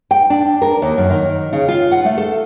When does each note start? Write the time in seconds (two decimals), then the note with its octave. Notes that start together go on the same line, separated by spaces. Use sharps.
0.11 G5
0.30 D4
0.62 A#4
0.82 D#2
0.98 F#2
1.10 D#3
1.53 C#3
1.68 F4
1.92 F#5
2.05 A3
2.18 A4